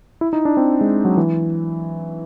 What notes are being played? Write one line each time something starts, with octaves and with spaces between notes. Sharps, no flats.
E4
D#4
D4
C4
G#3
F#3
E3